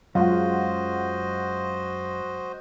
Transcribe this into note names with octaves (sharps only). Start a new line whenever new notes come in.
F#2 F#3 G#3 F4 F#4 C5 D#5 F#5